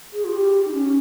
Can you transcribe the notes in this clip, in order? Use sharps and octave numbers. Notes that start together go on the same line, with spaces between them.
G#4
F4
G4
D#4
C#4